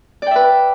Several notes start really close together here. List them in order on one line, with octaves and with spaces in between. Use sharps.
D5 G5 E5 B4